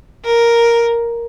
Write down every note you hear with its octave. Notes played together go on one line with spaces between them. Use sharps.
A#4